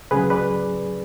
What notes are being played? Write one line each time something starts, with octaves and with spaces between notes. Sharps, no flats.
C#2 C#3 F#3 G#4 B4
B4 D5